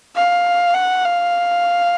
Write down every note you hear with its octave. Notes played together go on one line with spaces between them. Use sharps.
F5
F#5
F5